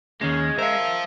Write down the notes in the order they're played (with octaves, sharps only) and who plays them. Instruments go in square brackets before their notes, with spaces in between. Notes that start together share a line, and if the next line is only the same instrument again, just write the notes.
[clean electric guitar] D#2 D#3 A#3 [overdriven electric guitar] G#3 [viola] C#4
[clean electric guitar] A#4 [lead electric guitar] C5 F5 [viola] E5